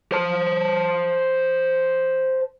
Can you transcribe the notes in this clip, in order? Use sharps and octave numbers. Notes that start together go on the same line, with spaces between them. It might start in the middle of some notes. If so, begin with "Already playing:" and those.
C5 A5